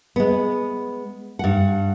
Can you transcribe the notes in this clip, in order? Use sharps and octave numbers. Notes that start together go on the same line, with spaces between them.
G#3 B3
G2 F#5